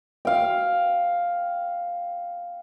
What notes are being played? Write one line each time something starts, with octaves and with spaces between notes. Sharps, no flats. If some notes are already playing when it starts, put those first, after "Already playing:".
F5 G5